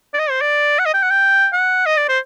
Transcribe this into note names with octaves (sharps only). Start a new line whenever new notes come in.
D5
D#5
C5
D5
F#5
D#5
G5
F#5
G5
F#5
D#5
D5
C5